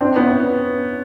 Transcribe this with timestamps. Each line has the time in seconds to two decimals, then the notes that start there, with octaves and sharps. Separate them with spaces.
0.01 C4 D4
0.16 B3 C#4